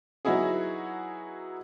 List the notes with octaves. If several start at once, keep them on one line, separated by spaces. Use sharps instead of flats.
F#3 B3 D#4 E4 F#4 G#4